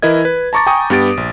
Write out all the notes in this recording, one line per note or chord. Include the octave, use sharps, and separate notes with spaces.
E3 E4 A#4 D#5 G#6
B4
A5 A#5 C#6 D6 A6
G5 G#5 A#5 C#6 D#6
G2 B3 G4 A6 D7
A#1